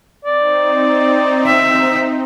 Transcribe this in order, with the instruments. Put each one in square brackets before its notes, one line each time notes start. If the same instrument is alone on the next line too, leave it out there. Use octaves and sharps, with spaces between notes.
[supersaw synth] C4 D#4 [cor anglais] D5
[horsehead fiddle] E5